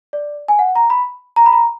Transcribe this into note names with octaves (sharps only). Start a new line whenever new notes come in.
D5
G#5
F#5
A#5
B5
A#5
B5
A#5